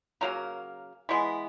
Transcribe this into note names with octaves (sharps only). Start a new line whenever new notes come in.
C#3 F#3 A#3 A#4
E3 G#3 B3